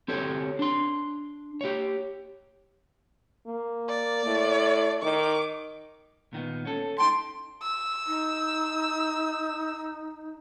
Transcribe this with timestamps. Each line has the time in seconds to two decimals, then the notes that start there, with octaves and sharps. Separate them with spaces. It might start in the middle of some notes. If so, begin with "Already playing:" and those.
0.08 C4 G4 A4 C#5
0.59 D4 C6
1.61 G4 C#5
3.47 A#3
3.89 D5
4.26 A2
5.03 D#3 D6
6.33 A#2 D#3 B3
6.65 C#4 A4
6.98 D#4 G5 A5 C6
7.63 E6
8.07 D#4